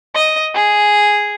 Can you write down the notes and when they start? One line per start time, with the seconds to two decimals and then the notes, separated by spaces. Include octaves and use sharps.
0.15 D#5
0.54 G#4